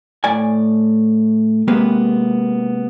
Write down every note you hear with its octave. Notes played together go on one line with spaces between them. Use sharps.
A2 D5 G#5
C3 G#3 A#3 B3 B4